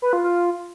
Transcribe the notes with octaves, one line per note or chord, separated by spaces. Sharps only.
B4
F4
F4